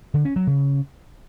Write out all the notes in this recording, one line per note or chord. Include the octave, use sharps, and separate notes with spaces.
D3
C#4
F#3
C#3